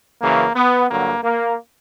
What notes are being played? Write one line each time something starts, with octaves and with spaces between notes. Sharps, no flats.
F#2 C#3 E3 A#3
B3
G2 D3 F#3 A#3
A#3